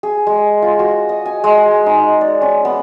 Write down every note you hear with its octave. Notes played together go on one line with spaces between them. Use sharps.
G#4
G#3
F4
F#4
D#5
G#5
G#3
D#4
D5
C#4
B3